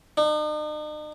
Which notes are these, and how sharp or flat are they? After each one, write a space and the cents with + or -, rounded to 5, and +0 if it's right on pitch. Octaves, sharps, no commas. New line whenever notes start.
D#4 -45